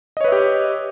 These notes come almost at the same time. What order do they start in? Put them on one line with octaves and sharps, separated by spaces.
D#5 C#5 B4 E5 G4